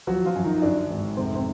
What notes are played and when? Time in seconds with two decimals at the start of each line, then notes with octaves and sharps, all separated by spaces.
0.07 F3 F#3 F#4
0.26 F3 F4
0.35 F#2
0.44 D#3 D#4
0.62 F#2 D3 D4
0.90 G#1
1.17 F1 C3 C4
1.35 C3 C4